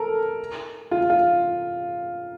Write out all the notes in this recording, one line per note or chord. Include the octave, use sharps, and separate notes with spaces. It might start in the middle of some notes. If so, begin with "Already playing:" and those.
Already playing: A4 A#4
F4
F4